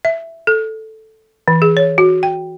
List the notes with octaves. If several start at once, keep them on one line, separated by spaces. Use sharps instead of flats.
E5
A4
E3
G#4
C#5
F#4
G5